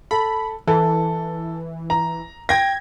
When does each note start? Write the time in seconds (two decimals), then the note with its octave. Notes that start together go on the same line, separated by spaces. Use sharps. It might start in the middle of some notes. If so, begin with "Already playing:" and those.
0.11 A4 B5
0.67 E3 A4
1.90 A#5
2.49 G5 G#6 A#6